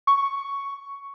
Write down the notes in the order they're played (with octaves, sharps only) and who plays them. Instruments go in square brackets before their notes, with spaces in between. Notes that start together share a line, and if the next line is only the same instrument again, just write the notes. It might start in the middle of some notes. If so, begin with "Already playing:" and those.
[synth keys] C#6